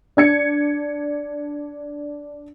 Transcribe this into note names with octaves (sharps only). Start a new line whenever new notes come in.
D4 G#6 C#7